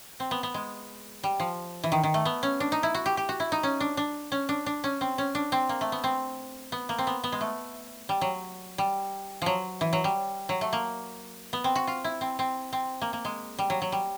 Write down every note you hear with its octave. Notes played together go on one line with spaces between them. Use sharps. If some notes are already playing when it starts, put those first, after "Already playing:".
C4
B3
B3
G#3
G3
F3
E3
D#3
D#3
A3
B3
C#4
D4
D#4
E4
F#4
G4
G4
F#4
E4
D#4
C#4
D4
D4
C#4
D4
D4
C#4
C4
C#4
D4
C4
A#3
A3
B3
C4
B3
A#3
C4
B3
B3
G#3
A3
G3
F#3
G3
F3 F#3
E3
F#3
G3
F#3
A3
A#3
B3
C4
F#4
F4
E4
C4
C4
C4
A#3
A#3
G#3
G3
F#3
F#3
G3